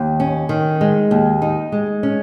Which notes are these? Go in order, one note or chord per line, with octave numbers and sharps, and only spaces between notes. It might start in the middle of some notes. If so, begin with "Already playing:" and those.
Already playing: D#2
C#4
D#3
G#3
D#2
D#4
G#3
C#4